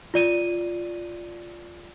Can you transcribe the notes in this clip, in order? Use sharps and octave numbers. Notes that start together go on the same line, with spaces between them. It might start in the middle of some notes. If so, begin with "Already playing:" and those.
F4 D5 D#7